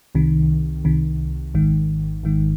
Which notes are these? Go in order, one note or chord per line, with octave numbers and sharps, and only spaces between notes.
C2 C3 D#3
C2 C3 D#3
G#1 G#2 D#3
G#1 G#2 D#3